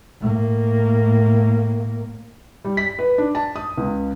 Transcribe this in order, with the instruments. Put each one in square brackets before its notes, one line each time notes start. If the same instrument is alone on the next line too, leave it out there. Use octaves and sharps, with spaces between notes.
[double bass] A2 A#3
[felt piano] G3
B6
B4
D4
A5
D#6
C#2